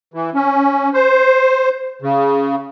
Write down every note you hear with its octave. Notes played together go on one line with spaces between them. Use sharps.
E3
C#4
C5
C#3